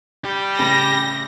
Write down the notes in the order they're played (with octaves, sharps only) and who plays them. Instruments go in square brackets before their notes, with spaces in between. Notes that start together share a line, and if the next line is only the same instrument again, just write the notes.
[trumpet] G3 [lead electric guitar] G4
[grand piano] A1 C#3 B5 [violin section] A#6